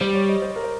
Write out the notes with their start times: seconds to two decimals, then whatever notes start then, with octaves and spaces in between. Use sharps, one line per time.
0.01 G3 C5
0.15 C#5
0.29 D#5
0.42 C5
0.56 A#4
0.63 C5